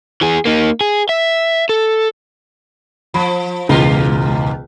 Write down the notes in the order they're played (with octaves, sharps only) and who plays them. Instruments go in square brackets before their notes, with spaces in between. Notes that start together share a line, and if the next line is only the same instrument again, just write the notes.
[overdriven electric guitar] E3 G#4
A#3 D#4
G#4
E5
A4
[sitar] F3 [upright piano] B5
[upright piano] E1 C#2 [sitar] G#2 F4 A#4